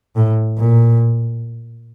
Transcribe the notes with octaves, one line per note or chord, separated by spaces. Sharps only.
A2
A#2